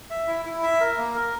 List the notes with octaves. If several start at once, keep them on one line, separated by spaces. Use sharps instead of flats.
E5
E4
E4
E5
A#4
A#3
A#4